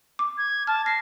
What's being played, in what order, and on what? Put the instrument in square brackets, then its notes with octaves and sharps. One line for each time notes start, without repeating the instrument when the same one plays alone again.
[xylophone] D6
[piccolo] G#6
[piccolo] A5 [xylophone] F6
[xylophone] A#6 [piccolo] C7